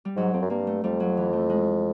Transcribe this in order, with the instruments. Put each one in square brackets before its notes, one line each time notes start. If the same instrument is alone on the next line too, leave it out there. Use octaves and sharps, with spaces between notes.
[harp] G3
[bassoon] G#2 [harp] F#3
[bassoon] F2 [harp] C4
[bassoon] F#2
[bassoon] G2 [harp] A#3
[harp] A3
[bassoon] F2 [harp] G3
[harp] F#3
E3
A3
G#3